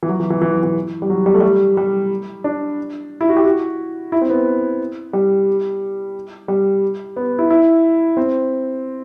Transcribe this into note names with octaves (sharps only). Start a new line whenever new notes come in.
E3
F#3
E3
E3
E3
F#3
E3
G3
F#3
G3
A3
G3
G3
D4
E4
F#4
G4
F#4
E4
C4
B3
G3
G3
B3
E4
E4
C4